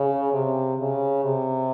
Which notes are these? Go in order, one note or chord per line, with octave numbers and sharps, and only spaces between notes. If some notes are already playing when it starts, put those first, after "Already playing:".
Already playing: C#3
C3
C#3
C3